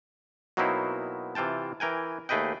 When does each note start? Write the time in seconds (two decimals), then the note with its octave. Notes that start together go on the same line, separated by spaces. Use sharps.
0.57 B2 F#3 A#3 C4 D#4 E4
1.35 C3 E3 F4 G5 A5
1.80 E3 A#4 G5 G#5
2.29 D#2 A3 G#4 B4 D#5 G5